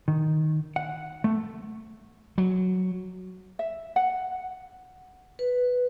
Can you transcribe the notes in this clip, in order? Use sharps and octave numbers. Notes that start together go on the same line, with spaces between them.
D#3
F#5
A3
F#3
E5
F#5
B4